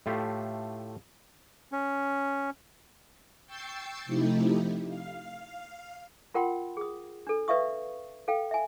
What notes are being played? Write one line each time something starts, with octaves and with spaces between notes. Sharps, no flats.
A2 A3 F4 G4
C#4
G5 C#6 E6 G6 A6 C7
C3 F3 A3 D#4 E4 G4
F5
F4 A#4 F#5 G5 B5 C6
G#4 D#6
D4 A4
B4 D5 E5 F5 C#6 D#6
A4 F5 G5
E5 G#5